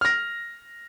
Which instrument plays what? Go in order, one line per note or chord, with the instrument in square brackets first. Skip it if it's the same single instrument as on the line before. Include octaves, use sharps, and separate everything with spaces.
[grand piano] F6 A#6